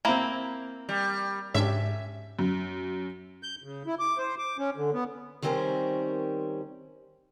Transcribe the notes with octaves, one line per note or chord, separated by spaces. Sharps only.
A#3 C4 E4 A#5
G3
G#2 C#4 D4 G4 E5
F#2
G6
C#3
E4
D6
C5
D6
C#4
D3
B3
D#3 G3 C4 C#4 A#4 C5